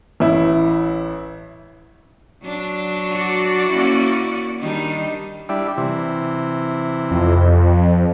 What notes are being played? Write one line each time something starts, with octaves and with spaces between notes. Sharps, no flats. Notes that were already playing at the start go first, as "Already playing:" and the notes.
A1 E4
F#3 D4
F#4 D5
A#3 C#4 E4
D#3 G3 D4 D#4
G3 D4 E4
C3 E3
F2